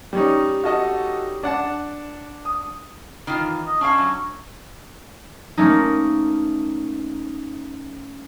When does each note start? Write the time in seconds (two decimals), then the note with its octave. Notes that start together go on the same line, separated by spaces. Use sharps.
0.13 G3 C#4 D#4
0.64 F#4 A4 D#5
1.43 D4 D5 F#5 A5
2.45 D#6
3.27 D#3 E3 F4
3.66 D#5
3.81 C#4 D4 E5 F5
3.98 F#3
5.57 A3 A#3 C#4 D#4